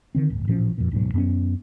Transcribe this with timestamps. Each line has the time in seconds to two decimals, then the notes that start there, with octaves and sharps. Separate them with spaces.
0.15 D3 D#3 C4
0.30 D1 G1
0.48 A1 A#2 F3 C#4
0.78 F2 A#2
0.91 D1 G#2 B2 F#3
1.14 F#2 B3 C#4